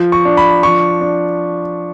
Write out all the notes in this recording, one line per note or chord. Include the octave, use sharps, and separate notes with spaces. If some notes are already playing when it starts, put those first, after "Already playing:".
Already playing: F3
C#6
D4
B5
F3 C#6
D4